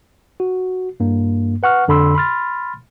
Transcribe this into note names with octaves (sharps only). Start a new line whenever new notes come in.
F#4
G2 A#3
B4 F#5 C#6 F6
F2 D3 A4 B5 C6 E6
B5 C6 F6 A6